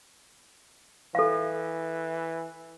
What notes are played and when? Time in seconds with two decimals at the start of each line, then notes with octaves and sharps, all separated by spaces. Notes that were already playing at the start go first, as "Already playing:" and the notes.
1.15 E3 A4 F5